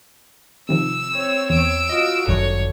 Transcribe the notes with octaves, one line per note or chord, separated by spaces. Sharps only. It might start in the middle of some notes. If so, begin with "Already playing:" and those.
C3 D#3 F3 E6
C4 C#5
E2 E6 D7
F4 F#4 D#5
G1 F#2 D3 D#3 C#5